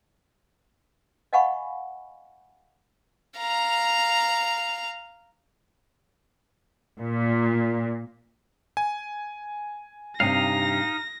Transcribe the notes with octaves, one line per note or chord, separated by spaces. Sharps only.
D#5 F5 F#5 G#5 B5 C#6
F5 A#5
A#2
G#5
G2 C3 D#4 F5 A#6